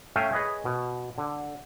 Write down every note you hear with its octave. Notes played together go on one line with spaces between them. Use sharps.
A3 C#4 E5 F5 G5 G#5
G#4 B4 C#5 D#5 G#5
B2
D3